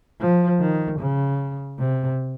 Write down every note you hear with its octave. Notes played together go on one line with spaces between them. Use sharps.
F3
D#3
C#3
C3